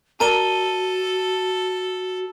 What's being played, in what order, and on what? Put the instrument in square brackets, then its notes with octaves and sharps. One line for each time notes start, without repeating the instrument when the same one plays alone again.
[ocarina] F#4 [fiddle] A4 [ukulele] A#4 D5 A#5 [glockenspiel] A5 D#7 G7